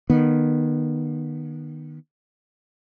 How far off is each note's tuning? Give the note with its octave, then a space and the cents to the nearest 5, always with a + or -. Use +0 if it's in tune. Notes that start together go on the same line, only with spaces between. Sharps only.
D#3 -30 B3 -30